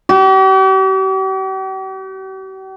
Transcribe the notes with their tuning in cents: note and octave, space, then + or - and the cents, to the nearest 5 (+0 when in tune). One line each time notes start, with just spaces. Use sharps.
G4 -45